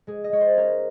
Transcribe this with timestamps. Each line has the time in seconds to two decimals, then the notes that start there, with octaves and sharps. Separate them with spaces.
0.07 G#3 G#4
0.24 D#5
0.32 G#3 C#5
0.41 C5
0.57 C#4 A#4